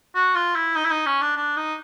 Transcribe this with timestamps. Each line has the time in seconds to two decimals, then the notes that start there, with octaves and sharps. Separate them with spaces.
0.15 F#4
0.35 F4
0.56 E4
0.76 D#4
0.85 E4
0.91 D#4
1.07 C#4
1.22 D4
1.36 D4
1.57 D#4